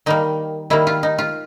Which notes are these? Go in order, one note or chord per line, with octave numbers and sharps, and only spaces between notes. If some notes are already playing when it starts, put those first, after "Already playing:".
D#3 G3 A#3 D#4
D#3 G3 A#3 E4
F4
D#4
F4